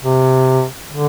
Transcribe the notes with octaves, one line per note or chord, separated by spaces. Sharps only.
C3
D3